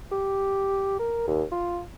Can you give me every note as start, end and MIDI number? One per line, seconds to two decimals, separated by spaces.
0.12 0.97 67
0.99 1.24 70
1.27 1.43 39
1.52 1.80 65